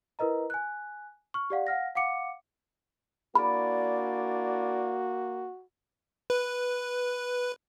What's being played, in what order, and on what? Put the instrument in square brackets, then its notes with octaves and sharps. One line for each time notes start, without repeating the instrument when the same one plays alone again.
[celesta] E4 A#4 B4 D#5 A#5
G#5 F#6
C#6 F6
G4 D5 F5 F#5
F5 F#5 F6 A#6
F5 F#5 D6 C#7
[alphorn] A#3 [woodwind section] D4 E4 D5 [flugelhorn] F#4 [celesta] B5
[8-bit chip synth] B4